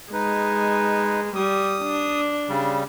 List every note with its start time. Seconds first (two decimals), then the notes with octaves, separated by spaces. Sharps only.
0.13 G#3 D#4 B4
1.36 G3 D#6
1.83 D4
2.49 C#3 G3